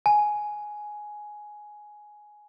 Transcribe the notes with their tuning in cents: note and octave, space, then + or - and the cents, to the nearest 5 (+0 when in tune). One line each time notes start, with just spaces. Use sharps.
G#5 +10